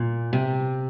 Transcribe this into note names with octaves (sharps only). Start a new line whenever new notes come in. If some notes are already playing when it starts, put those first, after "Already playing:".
Already playing: A#2
C3